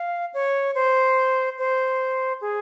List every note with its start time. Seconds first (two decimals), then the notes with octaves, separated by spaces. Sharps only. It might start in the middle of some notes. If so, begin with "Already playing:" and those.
Already playing: F5
0.34 C#5
0.75 C5
1.58 C5
2.41 G#4